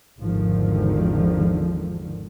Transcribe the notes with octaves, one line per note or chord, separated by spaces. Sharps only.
G#1 E2 G#2 D3 D#3 F3